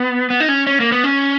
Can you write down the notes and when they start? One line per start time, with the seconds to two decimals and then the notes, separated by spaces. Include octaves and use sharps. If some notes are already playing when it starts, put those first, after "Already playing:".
Already playing: B3
0.30 B3
0.40 D#4
0.48 C#4
0.67 C#4
0.80 A#3
0.92 B3
1.04 C#4